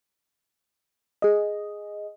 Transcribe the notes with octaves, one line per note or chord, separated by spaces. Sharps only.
G#4 D#5